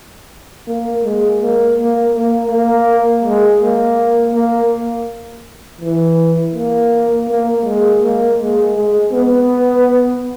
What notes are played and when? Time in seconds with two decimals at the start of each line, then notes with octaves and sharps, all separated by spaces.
0.68 A#3
1.04 G#3
1.41 A#3
1.77 A#3
2.15 A#3
2.51 A#3
3.24 G#3
3.61 A#3
4.35 A#3
5.81 E3
6.55 A#3
7.29 A#3
7.65 G#3
8.02 A#3
8.39 G#3
8.76 G#3
9.12 B3